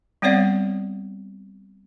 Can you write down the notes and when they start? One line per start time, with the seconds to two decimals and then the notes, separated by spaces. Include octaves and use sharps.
0.22 G3 B3 C4 C#5 D5 F5